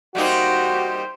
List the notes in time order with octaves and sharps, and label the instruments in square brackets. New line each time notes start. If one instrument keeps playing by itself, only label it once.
[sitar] G3 A#3 D#4 [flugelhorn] F#4 [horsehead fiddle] G4 C5